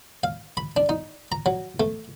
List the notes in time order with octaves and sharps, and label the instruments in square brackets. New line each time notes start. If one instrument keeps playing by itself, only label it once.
[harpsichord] F5
B5
D4
D#4
A#5
F#3
A3